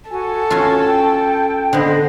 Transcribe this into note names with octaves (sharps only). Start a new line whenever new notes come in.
F#4 A4 G#5
C#4 F4
G5
D3 B3 C5 D#5